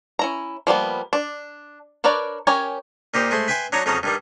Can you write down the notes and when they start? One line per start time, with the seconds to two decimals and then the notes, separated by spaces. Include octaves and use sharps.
0.19 C#4 E4 A#5
0.67 F3 G3 A#3 B3
1.13 D4
2.04 D4 A#4 B4 C#5 D5
2.47 C#4 G4 A#4 C#5 G#5
3.14 A#2 D#4 G4 C5
3.31 G#3 A3 C5
3.48 B4 E5 G5 G#5 C6
3.72 F#3 D4 D#4 C#5 D#5
3.86 F2 C#3 F#3 D#4 A5 D#6
4.03 G2 D#3 G3